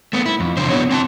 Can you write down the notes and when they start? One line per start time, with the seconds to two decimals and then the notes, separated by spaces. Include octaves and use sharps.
0.13 A3 B3
0.26 E4
0.40 F2
0.57 E2 C#3 D4 C5
0.69 B3 E4 F#4 C#5
0.91 C4 G#5 A5